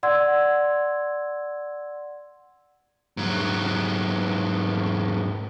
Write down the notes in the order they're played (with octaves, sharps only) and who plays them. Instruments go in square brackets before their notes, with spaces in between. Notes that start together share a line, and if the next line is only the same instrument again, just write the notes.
[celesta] D5 F#5 C6 E6 G#6
[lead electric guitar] G#2 F#3